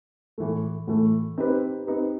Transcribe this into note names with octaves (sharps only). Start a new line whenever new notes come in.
A2 E3 A3
A2 E3 A3
C4 D#4 G4 B4
C4 D#4 G4 B4